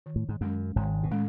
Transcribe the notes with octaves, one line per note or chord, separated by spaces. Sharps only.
D#3
A2
G#2
F#2 G#3 C#4
G#1 G#2 D#3
B2
A2 G#3 C#4